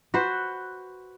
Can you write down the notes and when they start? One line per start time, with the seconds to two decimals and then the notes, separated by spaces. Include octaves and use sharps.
0.14 F#4 B4 C5 F#5